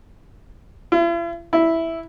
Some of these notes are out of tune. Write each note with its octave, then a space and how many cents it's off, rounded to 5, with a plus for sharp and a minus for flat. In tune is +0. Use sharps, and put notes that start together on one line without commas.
E4 +45
E4 -5